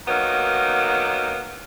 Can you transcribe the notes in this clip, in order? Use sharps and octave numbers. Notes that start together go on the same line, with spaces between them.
D#3 F#3 A#3 B3 D#4